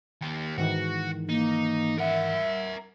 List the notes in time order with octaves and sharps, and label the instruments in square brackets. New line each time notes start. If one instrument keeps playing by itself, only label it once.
[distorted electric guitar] D#2 G4
[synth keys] G#2 D#3 E3 [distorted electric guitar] F#4
[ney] A#3 [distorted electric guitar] D#4
[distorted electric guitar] A#4 F#5 [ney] E5